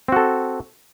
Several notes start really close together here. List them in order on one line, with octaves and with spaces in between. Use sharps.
C4 F#4 A4